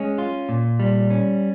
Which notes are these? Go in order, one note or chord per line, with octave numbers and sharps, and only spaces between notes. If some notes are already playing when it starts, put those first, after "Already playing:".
Already playing: G#3 C#4
F4
A#2
G3
C#4